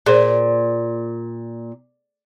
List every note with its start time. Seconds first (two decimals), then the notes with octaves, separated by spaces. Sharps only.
0.06 A#2 G#4 C5